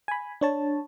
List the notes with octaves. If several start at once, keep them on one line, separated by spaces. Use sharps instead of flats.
G#5 B5
D4 C#5 A5